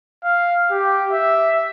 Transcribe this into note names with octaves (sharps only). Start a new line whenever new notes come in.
F5
G4
E5